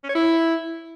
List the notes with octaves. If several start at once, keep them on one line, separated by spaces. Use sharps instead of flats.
C#4
C#5
E4